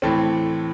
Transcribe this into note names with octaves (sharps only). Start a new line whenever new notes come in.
A2 E3 A3 C4